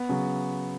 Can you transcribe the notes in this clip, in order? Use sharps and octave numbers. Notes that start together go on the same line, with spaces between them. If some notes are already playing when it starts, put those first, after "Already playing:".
Already playing: B3
C#3 F#3